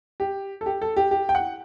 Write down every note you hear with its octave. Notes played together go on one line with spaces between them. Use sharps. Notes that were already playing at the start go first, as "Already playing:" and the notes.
G4
A4
G4
A4
G4
G4
G5
F#5